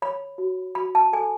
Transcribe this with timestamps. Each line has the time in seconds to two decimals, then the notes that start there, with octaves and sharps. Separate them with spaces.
0.02 C#5 B5
0.38 F#4
0.75 F#4 B5
0.95 A5
1.13 A4 G#5